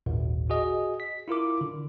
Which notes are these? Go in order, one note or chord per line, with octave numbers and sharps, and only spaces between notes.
G#1 D#2 A#2
F#4 G#4 D#5
B6
E4 F4 A#4 D6
D3